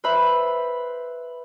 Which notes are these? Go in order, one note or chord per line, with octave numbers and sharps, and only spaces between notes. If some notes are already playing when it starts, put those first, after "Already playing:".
B4 C5 E5 B5